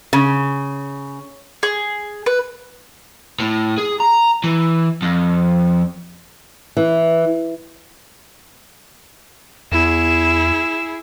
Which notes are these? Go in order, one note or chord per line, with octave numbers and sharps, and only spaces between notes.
C#3
G#4
B4
A2
G#4
A#5
E3
F2
E3
E2 E4 G#4 E7